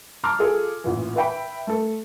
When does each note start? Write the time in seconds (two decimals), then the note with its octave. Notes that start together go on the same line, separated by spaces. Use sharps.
0.24 A5 A#5 C6 D6 E6 F6
0.39 F4 G#4 A4
0.84 A1 A#2 E3
1.16 B4 E5 G5 B5
1.67 A3 A4